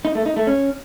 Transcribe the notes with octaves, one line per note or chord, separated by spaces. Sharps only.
D#4
A3
D#4
A3
C#4